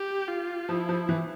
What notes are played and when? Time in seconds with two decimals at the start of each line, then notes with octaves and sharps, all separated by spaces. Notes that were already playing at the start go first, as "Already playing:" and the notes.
Already playing: G4
0.28 F4
0.69 F3 E4
0.89 F3
1.09 E3